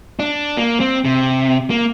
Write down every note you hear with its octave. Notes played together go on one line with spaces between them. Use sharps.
D4
A#3
C4
C3
A#3